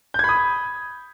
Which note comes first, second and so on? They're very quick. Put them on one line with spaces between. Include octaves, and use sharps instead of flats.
G6 G#6 B5 D#6